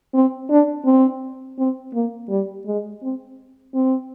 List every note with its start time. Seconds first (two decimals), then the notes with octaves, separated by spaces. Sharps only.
0.14 C4
0.50 D4
0.85 C4
1.58 C4
1.94 A#3
2.29 G3
2.66 G#3
3.02 C4
3.74 C4